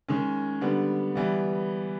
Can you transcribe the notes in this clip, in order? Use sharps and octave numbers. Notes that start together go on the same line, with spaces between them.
D#3 G#3 C#4
D3 G3 B3
E3 G3 B3